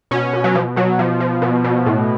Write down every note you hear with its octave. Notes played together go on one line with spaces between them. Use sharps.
B2 C#4
B2
F#3
B2 F3
B2 F#3
F3
F3
B2
B2
A2